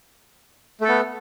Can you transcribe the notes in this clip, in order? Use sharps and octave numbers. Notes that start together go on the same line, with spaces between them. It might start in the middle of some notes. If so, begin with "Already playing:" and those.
A3 B3 A4